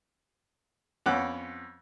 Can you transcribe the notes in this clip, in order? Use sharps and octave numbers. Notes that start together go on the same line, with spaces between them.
F2 B3 C#4 F#5 D6 F#6